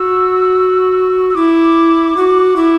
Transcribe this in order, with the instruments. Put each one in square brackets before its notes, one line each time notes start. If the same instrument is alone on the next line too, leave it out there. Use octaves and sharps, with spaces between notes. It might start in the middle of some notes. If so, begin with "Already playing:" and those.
Already playing: [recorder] F#4 [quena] E6
[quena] E6
[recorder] E4 [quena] D6
[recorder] F#4
E4